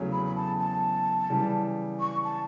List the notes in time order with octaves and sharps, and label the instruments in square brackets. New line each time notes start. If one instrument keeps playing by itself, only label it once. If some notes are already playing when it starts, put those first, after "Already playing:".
Already playing: [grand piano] E2 C#3 F#3 A3 C#4
[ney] B5
B5
A5
A5
[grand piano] C#3 E3 G3
[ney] C#6
A5